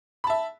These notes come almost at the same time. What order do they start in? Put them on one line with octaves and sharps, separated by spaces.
B5 A5 E5